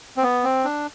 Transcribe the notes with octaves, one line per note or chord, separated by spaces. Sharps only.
C4
B3
C4
D4